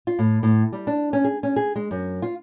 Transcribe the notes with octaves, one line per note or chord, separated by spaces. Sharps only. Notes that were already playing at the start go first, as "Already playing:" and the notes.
F4
A2
A2
G3
D4
C#4
G#4
C#4
G#4
G#3
F#2
F4